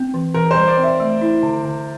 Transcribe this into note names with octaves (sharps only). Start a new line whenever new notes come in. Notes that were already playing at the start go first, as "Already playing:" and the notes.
Already playing: C4
E3
E3 A#4
C5
G3
D5
C4
E5
A3
E4
D3
D3